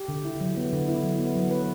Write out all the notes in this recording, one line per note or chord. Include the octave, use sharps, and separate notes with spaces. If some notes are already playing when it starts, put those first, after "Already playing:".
Already playing: G4
D3
E4
F#3
B3
D3
E4
F#3
B3
F#3
B4